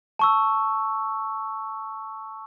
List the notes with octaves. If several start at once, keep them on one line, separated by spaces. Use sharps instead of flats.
A5 C#6 E6